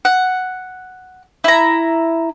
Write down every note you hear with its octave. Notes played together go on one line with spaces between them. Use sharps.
F#5
E4 A#5